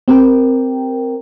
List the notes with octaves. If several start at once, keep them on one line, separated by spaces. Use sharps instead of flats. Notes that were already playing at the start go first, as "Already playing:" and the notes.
C4 G4 A#4 G5